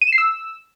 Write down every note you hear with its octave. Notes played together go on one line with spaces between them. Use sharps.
D#7
E7
C7
E6